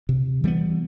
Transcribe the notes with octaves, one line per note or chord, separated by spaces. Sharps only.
C3
E3 G3 B3